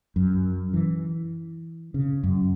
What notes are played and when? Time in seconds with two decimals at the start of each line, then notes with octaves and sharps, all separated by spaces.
0.16 F#2
0.74 E3
1.94 C#3
2.23 F#2